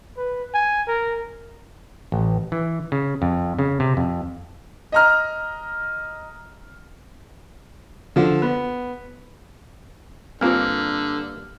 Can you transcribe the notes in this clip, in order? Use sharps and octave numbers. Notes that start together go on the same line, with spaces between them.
B4
G#5
A#4
A1
E3
C#3
F2
C#3
C3
F2
D#5 A#5 F6
D3 F3
B3
G2 D3 A#3 C4 F4 A#4 C5 F6